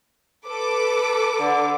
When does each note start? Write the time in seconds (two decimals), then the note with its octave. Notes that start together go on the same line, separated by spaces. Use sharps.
0.47 A4 B4 D6
1.40 D3